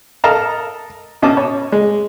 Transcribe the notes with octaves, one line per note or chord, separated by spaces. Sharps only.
A4 A#4 D#5 F5 A5 A#5
B2 C#4 D#5 A5 D6
C#5
G#3